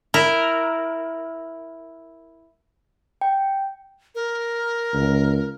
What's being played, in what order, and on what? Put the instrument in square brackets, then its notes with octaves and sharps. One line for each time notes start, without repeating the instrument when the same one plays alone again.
[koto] E4 A#4
[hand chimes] G5
[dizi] A#4
[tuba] C#2